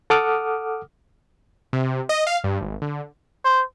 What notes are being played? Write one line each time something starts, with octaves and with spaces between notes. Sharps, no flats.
A4 F#5 D6 D#6 F6
C3
D#5
F5
G2
G#1
D3
C5